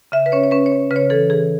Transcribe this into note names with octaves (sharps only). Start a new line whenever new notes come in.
C#3 E5
B4
C#4 C#5
C#5
C#4 B4
C#5
C#4
C#3 B4
C#5
E3 A4
E3 G#4